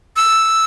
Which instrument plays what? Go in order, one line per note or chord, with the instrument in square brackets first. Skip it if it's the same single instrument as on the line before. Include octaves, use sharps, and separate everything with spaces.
[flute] E6